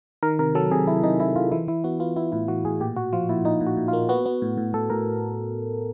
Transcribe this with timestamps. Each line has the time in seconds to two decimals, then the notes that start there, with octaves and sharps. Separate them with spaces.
0.23 D#3 A#4
0.39 C3 A#4
0.55 F#3 A4
0.71 C3 G#4
0.87 C3 E4
1.03 C3 D#4
1.20 C3 E4
1.36 C3 F4
1.52 E3 E4
1.68 E3 E4
1.84 B3 F#4
2.00 B3 F4
2.16 B3 E4
2.32 A2 E4
2.48 E3 F#4
2.65 A2 G#4
2.80 A#2 G4
2.96 A#2 F#4
3.13 F3 F4
3.29 A#2 E4
3.45 A#2 D#4
3.61 A#2
3.66 F#4
3.77 A#2
3.88 F4
3.93 A#3
4.09 B3 F#4
4.26 B3
4.42 A2
4.57 A2
4.74 A2 A4
4.90 A2 A#4